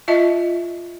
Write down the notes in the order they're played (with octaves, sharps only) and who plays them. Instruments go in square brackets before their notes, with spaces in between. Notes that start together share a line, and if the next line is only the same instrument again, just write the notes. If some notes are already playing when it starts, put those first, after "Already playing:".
[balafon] F4 D#5 E5 A5